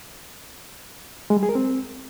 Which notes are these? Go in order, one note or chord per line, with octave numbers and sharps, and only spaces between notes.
G#3
G3
G#4
A#4
C4